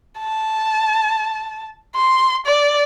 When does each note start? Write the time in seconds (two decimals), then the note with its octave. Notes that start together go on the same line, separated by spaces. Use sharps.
0.19 A5
1.96 C6
2.46 D5